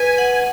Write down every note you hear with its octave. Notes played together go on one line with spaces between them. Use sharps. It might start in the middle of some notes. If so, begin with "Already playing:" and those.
Already playing: B4 G#5
F#5